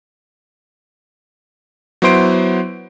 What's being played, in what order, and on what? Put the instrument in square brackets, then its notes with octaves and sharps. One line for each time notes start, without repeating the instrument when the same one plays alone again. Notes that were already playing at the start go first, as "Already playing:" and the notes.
[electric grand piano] F#3 B3 E4 C5 C6 D7